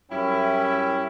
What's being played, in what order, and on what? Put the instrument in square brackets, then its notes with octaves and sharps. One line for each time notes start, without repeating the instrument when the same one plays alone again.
[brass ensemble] F#2 G5 [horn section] G3 C#4 E4